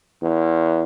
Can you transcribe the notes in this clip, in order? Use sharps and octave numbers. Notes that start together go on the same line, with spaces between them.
E2